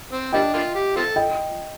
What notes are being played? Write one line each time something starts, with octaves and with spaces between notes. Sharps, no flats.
C4
G3 A#3 D4 D#5 G5
A#3 D4 F4
G4
C4 F4 A4
D#5 G5